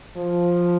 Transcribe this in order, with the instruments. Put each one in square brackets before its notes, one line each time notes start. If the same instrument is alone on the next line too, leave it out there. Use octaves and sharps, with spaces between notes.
[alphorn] F3